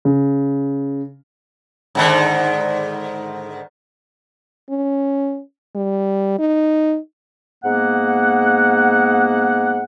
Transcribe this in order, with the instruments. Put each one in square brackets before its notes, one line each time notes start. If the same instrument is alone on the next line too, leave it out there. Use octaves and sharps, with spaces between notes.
[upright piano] C#3
[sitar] G#2 D3 D#3
[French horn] C#4
G3
D#4
[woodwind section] G#2 A#3 B3 F#5